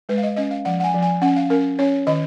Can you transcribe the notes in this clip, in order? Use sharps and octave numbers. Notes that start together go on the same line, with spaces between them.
G#3 B4
F5
D#5
C#4 D#5
F5
F3 F#5
F#5
G#5
F3
G#5
C#4 F#5
F5
C#4 A#4
C#4 C#5
D#3 D#5